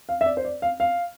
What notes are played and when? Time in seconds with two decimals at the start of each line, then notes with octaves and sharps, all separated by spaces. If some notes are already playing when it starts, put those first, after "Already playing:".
0.09 F5
0.21 E5
0.26 D5
0.37 C5
0.45 D5
0.62 F5
0.80 F5